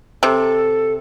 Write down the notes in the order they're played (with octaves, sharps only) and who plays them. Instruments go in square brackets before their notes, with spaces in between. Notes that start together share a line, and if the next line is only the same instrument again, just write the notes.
[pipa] C3 [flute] A4